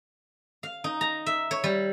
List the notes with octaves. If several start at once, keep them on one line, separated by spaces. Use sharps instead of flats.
F5
D#4
A#5
E5
C#5
G3